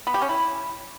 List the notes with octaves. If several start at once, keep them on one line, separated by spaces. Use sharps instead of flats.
B3
G4
C#4
E4